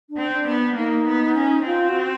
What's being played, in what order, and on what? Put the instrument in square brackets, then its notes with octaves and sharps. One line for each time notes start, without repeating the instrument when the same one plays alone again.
[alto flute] D4
[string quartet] C4
[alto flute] D4
[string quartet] B3
[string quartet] A#3 [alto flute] D#4
[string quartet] B3
C#4
[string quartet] C4 [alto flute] F4
[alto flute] F#4